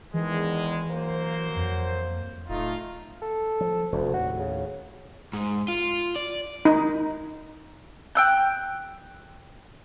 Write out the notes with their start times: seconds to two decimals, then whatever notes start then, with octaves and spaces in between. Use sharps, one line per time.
0.14 E2 D#3 E3 G#3
0.90 F#3 A#3 C5
1.56 F2
2.49 D1 A3 D#4 F4
3.22 A4
3.61 F3
3.92 F1 D2
4.14 D#2 A2 F#4
4.39 C#3
5.33 G#2
5.68 F4
6.16 D5
6.65 D#4
8.15 G5 E6 F#6